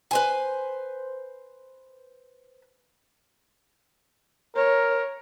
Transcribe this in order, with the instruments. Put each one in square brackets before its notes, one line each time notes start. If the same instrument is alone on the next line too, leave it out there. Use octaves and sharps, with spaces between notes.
[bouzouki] B4 C5 G#5
[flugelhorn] A#4 [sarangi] C#5